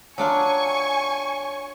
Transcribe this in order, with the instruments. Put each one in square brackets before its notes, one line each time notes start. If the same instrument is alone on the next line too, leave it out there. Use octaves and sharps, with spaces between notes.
[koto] F#3 D4 F4 [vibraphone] C#5 [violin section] G#5 C#6